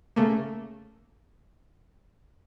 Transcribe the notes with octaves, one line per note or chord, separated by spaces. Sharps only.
C#3 A3 A#3